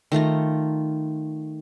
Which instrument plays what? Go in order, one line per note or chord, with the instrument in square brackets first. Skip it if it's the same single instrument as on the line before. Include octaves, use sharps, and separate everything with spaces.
[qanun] D#3 A3 F4 A#5